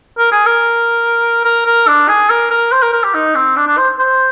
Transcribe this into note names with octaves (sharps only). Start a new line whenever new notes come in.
A#4
G#4
A#4
A#4
A#4
D4
G#4
A#4
A#4
C5
A#4
A#4
G4
D#4
C4
D4
D4
C5
C5